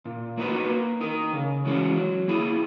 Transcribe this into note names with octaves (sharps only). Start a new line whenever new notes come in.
A#2
A#3 D#4 F#4 B4
A#3
D#4 A#4
C#3
E3 G#3 C#4 F#4
F#3
A#3 E4 G#4